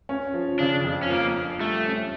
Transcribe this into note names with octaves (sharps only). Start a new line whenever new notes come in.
C#4
F3
C#3 D4
F2
C#4
F3 A#3
D4
G3 A3
C#4